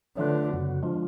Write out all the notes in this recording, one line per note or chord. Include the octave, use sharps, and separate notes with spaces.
D3 F#3 A3 D4 F4 B4
F#2 C#3 F#3 B3 F#4
F3 G#3 D4 F4